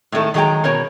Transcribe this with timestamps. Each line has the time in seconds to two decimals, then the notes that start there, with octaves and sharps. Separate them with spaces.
0.12 A2 D#3 G#3 A4
0.34 D#3 F#3 G#3 G#4 G5 A#5
0.64 B2 A#4 C#5